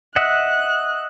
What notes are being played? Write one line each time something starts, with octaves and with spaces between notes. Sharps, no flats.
D#5 E5 F#5 F#6